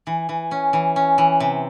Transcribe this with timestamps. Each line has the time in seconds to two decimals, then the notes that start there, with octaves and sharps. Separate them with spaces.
0.07 E3
0.29 E3
0.51 C#4
0.73 E3
0.96 C#4
1.18 E3
1.40 C3